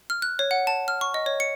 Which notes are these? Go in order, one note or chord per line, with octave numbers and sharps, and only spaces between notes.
F6
F#6
C#5
F#5
A5
F6
C#6
D#5
C#5
C#7